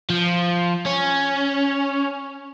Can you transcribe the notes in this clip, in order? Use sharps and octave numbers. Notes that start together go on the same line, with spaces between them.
F3
C#4